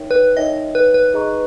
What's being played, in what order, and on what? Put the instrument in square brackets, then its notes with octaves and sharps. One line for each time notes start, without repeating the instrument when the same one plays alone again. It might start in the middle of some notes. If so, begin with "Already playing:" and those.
Already playing: [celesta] D#4 A#4 C#5 E5 G5
[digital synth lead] B4
[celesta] D#4 A#4 C#5 E5 G5 [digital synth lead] D#5
[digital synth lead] B4
B4
[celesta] D#4 G#4 D#5 A#5 C#6